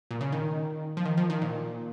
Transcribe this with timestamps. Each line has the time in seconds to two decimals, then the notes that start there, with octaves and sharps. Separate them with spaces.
0.11 A#2
0.21 C#3
0.32 D#3
0.97 F3
1.05 D#3
1.17 F3
1.30 D#3
1.42 A#2